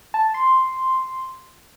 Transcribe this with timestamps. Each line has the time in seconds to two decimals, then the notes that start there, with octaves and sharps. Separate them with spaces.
0.14 A5
0.34 C6